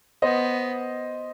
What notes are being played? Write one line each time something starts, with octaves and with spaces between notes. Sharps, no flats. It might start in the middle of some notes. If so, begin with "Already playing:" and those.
B3 C5 D#5